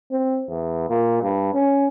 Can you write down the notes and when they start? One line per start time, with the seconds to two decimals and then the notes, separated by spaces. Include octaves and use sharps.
0.12 C4
0.50 E2
0.89 A#2
1.23 G2
1.54 C#4